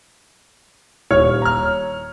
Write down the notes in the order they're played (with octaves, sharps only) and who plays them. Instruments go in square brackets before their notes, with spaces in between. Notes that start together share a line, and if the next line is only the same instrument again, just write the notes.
[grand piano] D#1 F6 [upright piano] C#5
[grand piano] A#5 F6